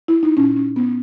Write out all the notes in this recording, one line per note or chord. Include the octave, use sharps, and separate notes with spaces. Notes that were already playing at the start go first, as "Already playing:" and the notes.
E4
D#4
A#2 C#4
C#4
B3